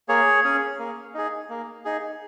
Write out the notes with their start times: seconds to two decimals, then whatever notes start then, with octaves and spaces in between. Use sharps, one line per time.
0.09 A#3 G#4 C#5
0.44 C#4 G#4
0.79 A#3
1.14 D#4 G#4
1.49 A#3
1.85 D#4 G#4